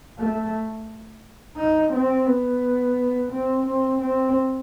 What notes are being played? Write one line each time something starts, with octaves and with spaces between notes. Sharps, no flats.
A3
D#4
C4
B3
C4
C4
C4